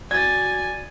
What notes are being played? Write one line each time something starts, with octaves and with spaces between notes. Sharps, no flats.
F#4 D5 G#5 G#6 A6